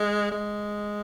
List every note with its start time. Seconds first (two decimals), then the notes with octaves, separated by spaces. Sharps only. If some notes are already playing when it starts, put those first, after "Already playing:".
Already playing: G#3
0.31 G#3